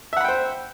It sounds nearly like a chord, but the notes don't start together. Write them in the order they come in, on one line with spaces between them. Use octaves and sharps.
E5 F#5 B5 G5 C5